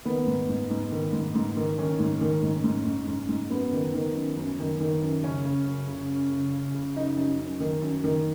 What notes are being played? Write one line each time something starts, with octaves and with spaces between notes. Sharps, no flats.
D#3 B3
G#2
G#2
G#2
D#3
G#2
G#2
D#3
D#3 C#4
G#2
D#3
G#2
G#2
G#2
G#2
G#2
F#2 B3
D#3
D#3
F#2
F#2
D#3
D#3
F#2
C#3 C#4
C#3
F#2
C#3
F#2
C#3
C#3
C#3
F#2 D#4
F#2
F#2
D#3
F#2
D#3